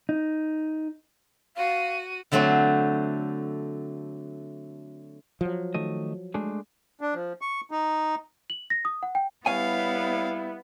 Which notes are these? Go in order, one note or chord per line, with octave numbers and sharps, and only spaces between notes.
D#4
F#4 F5 D#7
D3 F#3 A3 C4 F#4 C5
F3 F#3
D#3 A3 D#5
G#3 A3 D4
D4
F3
C#6
D#4
F#7
A#6
D#6
F#5
G5
G3 B3 E4 C#5 F5 G#5